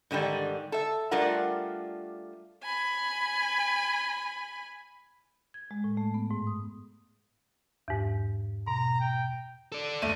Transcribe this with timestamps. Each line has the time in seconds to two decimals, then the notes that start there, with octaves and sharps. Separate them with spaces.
0.11 G#2 D3 D#3 G3
0.72 A4 E5
1.11 G3 A3 D4 F4 A#4 F#5
2.63 G#5 B5
5.54 G#6
5.71 G#3
5.84 A2
5.97 A3
6.14 B3
6.31 G#2
6.47 D#6
7.88 E2 G#2
8.67 B2 A#5
9.00 G5
9.72 A4 D5
10.02 G1 A3 D#7